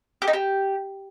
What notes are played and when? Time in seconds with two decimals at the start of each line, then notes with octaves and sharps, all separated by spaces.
0.22 G4
0.28 D#4
0.33 G4